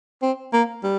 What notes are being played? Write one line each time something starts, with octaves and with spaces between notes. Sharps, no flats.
C4
A#3
G3